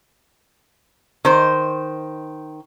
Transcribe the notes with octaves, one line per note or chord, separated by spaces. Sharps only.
D#3 C5